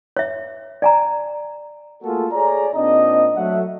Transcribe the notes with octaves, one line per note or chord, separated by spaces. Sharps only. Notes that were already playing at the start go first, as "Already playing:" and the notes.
C#5 E5
D5 G#5 A#5
A3 A#3 F4 F#4 G#4 A4
G#4 A4 C#5 D5 G#5 A#5
A#2 C4 D4 D#4 D#5
F#3 A3 E5 F#5